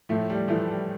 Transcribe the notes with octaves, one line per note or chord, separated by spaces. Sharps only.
A2 F3 A3
G3
E3 F3 A3
G3